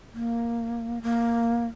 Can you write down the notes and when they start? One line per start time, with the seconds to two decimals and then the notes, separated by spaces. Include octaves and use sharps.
0.14 A#3
1.03 A#3